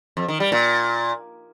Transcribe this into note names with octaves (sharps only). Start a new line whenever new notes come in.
F2
D#3
G3
A#2